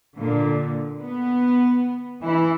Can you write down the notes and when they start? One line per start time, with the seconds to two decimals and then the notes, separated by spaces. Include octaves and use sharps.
0.17 A#2 D3
1.01 B3
2.21 E3 E4